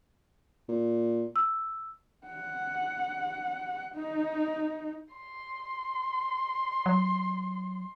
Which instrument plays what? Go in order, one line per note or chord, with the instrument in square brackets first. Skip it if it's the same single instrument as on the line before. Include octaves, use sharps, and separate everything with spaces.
[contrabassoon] A#2
[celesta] E6
[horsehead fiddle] F#5
D#4
[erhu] C6
[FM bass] F#3